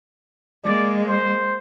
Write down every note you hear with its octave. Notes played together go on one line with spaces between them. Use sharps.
G#3 A#3 D5
C5